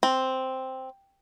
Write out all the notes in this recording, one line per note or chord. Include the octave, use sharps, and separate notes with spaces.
C4